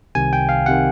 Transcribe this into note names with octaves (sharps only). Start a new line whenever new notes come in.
C2 C3 D#3 G#5
G5
F5
C3 D#3 F#5